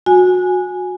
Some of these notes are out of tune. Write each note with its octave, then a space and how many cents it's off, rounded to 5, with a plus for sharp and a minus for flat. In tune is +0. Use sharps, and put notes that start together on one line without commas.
F#4 -25 G#5 +0